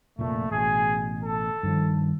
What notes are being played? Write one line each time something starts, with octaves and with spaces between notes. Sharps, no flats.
F1 A#1 A#2 A3
A1 B2 G#4
A4
G2 D#3 F3